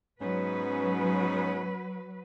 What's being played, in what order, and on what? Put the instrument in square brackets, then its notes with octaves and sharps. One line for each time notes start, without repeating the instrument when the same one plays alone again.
[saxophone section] G#2 B3 C#4 [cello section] F#3 B4